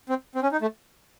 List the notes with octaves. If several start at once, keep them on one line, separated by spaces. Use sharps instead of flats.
C4
C4
C#4
D#4
A3